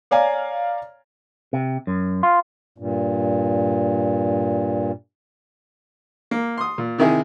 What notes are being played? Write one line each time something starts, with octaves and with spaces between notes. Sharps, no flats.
C#5 D5 F5 G#5 A#5
C3
F#2
F4
G2 A#2
A#3
C6 D#6
A#2
C3 D#3 E4 G#4